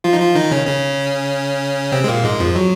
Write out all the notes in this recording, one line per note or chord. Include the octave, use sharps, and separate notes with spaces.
F3 F4
D#4
F3 F4
D#3 D#4
C#3 C#4
C#3 C#4
C3 C4
G#3
A#2 A#3
G#2 G#3
F2 F3
F#3